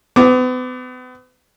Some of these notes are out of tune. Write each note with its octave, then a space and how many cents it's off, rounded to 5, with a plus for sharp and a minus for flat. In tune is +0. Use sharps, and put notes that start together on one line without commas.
B3 +40 D6 +0